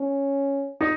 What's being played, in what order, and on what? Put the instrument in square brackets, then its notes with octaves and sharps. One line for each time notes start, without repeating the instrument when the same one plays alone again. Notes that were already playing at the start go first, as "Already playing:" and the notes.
Already playing: [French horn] C#4
[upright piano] D#4